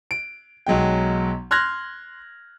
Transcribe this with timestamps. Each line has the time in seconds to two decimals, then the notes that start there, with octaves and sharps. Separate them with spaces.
0.11 D7
0.67 B1 F#3 G#3 G5
1.51 C6 F6 F#6 G#6 A#6